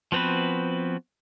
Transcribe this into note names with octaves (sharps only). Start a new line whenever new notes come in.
F3 B3 C4 F#4 B4